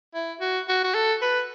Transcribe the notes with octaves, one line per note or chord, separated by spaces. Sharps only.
E4
F#4
F#4
F#4
A4
B4